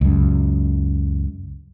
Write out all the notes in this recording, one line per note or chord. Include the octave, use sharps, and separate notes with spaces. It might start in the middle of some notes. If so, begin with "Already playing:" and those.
C#2 F#2